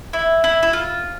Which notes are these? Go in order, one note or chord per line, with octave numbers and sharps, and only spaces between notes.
E4
E4
E4
F4